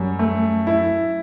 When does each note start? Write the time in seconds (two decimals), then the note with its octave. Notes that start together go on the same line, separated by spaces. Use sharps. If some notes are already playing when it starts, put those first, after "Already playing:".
Already playing: F#2 G3
0.19 A3
0.67 E4